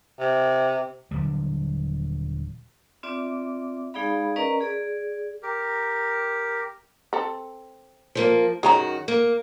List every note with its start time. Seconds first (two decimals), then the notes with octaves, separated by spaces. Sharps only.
0.20 C3
1.11 D#1 D3 F#3 G3
3.03 C4 F4 D5 E5 D6
3.94 G#3 D#4 G#4 D5 F5 B5
4.36 C#4 A#4 B4 D5 D#5 A#5
4.61 G#4 D5
5.43 G4 A#4
7.13 C4 A4
8.15 F3 G3 A#3
8.63 F#2 D#3 F#4 G#4 C#5 A#5
9.08 A#3